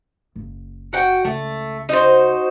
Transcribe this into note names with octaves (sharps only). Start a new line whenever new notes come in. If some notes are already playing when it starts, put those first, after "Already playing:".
F#1
F#4 F#5 G5
C#2 A3
D#4 F#4 C5